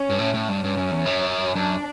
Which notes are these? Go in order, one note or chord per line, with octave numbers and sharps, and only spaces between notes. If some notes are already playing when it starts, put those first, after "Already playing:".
Already playing: C#4
G2
A2
A2
G2
G2 C#4
F#2
E2
F#2
F#2 D4